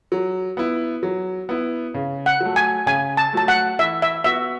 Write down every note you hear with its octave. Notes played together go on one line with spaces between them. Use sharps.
F#3
B3 E4
F#3
B3 E4
C#3
F#5
F#3
A3
G#5
C#3 G#5
A5
F#3 A3 A5
F#5
E3 E5
E5
B3 F#4 E5